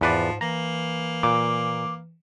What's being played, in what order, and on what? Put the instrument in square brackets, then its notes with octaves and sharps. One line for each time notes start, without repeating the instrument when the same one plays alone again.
[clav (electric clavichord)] E2 B4 D5 [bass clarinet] G#2 [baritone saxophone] F3
[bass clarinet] E3 [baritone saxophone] A#3 [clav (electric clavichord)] A#5
[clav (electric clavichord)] A#2 [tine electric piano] D6